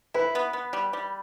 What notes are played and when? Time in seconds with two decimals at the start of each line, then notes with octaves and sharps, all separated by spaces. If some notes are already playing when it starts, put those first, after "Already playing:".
0.14 E4 B4
0.35 B3
0.53 B3
0.73 G3
0.93 G3